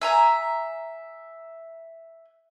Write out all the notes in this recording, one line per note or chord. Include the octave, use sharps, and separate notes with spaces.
E5 G#5 A#5